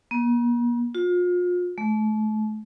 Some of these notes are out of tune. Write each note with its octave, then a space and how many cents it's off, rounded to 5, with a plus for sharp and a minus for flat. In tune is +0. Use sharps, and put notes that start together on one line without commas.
A#3 +45
F4 +35
A3 -35